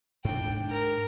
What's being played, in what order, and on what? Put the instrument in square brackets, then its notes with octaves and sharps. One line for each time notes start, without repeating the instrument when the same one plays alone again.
[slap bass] G#2 D4 [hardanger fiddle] G5
[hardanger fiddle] A#4